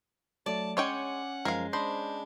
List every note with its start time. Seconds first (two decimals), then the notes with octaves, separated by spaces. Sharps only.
0.46 F#3 A3 D5 A5
0.77 G#3 C#4 C#5 F#5 G5 D6
1.45 F#2 F3 G#3 A#4 F5
1.73 D4 C5 D#5 B5